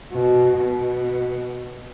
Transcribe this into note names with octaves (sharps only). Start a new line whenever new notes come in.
B2
B2